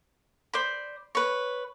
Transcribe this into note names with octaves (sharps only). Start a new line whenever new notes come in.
C5 D5 B5
B4 C#5